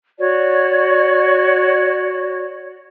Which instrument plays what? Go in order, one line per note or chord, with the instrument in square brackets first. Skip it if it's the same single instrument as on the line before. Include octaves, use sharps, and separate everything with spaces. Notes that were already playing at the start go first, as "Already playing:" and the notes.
[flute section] F#4 C#5 D5